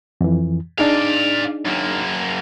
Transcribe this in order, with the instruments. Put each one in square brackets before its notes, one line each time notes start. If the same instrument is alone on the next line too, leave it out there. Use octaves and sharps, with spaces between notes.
[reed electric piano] F2 E3
[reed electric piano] D4 D#4 G#4 [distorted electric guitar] D5 F5
[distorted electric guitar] F#2 A#3